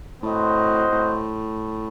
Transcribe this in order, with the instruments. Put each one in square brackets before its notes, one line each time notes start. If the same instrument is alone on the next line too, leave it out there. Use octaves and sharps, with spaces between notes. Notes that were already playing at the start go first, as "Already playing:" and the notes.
[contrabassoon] A2 [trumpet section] C4 F#4 C5 D#5
[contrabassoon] A2